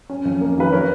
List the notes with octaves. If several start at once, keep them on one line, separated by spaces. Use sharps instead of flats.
C#4
F2
A#3
D#3 B4
D#4 A#4 C#5